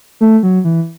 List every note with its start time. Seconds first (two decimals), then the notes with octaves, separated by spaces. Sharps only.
0.21 A3
0.43 F#3
0.65 E3